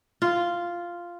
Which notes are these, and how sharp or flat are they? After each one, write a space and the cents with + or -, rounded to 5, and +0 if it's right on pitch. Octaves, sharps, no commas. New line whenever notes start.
F4 -5